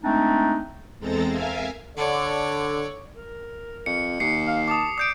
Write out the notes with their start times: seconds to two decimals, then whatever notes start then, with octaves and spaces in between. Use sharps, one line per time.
0.02 G#3 A3 C4 D4 D#4
0.99 E2 G#3 C4 A4 A#5 A6
1.29 A#4 E5 F5 G#5
1.97 D3 C#5 D5
3.13 A#4
3.86 F2 C#7
4.20 D#2 C7 C#7
4.47 F5
4.68 A5 D6 D#6
4.98 D5 D#6 G6 D7